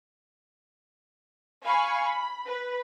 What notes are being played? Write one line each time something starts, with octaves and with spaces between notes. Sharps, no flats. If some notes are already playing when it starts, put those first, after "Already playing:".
F5 G#5 B5 C#6
B5
B4